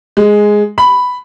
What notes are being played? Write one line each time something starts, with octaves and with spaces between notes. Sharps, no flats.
G#3
B5